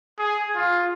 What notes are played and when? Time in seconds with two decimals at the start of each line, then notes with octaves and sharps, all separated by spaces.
0.19 G#4
0.55 F4